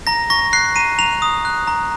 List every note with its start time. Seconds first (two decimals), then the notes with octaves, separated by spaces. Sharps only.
0.07 A#5 A#6
0.30 C#6 A#6
0.53 F#6 C7
0.76 A#5 D#7
0.98 A#5 F7
1.22 D#6
1.45 F#6
1.67 A#5